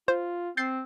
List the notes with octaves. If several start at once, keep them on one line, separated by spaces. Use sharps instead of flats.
F4 C5
C4 G6 A6 C7